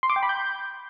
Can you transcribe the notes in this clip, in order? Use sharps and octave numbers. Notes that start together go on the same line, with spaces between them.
C6
D6
G5
B5
G6